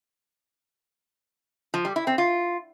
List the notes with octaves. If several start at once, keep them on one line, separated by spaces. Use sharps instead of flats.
F3
G3
E4
C4
F4